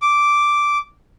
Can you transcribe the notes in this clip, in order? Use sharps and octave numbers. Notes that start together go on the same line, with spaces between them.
D6